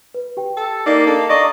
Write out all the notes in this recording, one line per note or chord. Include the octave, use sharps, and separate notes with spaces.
B4
G4 G5
A4
A#3 D#4 D5
D4 A4
D5 D#5 A#5 C#6 A#6